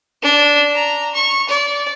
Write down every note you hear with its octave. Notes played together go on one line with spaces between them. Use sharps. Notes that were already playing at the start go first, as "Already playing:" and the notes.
D4
A#5
C#6
D5